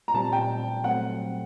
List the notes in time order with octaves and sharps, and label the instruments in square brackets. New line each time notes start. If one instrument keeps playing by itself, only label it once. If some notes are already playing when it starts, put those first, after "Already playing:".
[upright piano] A#5
[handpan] A#2 G3 C4 [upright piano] A5
[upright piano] G5
[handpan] F#3 A3 C4 [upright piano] F#5